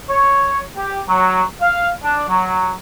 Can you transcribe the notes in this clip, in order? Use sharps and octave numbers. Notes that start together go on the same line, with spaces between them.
C#5
G4
F#3
F5
D4
F#3